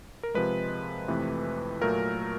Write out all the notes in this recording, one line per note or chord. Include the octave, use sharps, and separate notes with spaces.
A#4
C3 F3 G#3 B4
F2 C3 E3 A3
A#2 F#3 A3 A#4